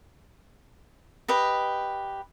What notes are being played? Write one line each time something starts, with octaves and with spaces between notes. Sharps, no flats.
G4 B4 D#5